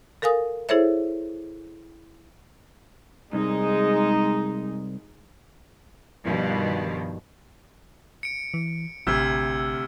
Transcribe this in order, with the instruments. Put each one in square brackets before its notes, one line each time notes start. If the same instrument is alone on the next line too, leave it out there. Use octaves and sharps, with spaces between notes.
[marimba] A4 A#4 F5 G#5 D#6
E4 G#4 A4 C5 C#5 E5
[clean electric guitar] C2 [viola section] G#3 D#4
[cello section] G2 B2 D#3 F3
[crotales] C#7 D7
[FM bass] E3
[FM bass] A1 [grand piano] D2 C3 [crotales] E6 F6 G#6